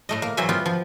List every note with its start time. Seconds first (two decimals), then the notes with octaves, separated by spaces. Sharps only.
0.09 A2 A3 D#5
0.22 A#3
0.37 E3 F#3 C5 E5 G#5
0.49 B3 F4 G4
0.66 F3